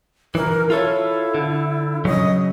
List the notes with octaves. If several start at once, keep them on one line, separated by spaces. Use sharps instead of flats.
E3 A#4
E4 F4 A4 C#5
D3
C#3 F#3 D#5